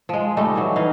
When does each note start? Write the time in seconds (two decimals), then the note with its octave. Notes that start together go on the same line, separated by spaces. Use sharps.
0.09 F3 G#3
0.37 G3 A3 D#4
0.55 E3 F#3
0.76 E3 D#4 F5